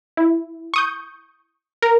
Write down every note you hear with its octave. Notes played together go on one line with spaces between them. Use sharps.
E4
C#6 D#6 G6
A#4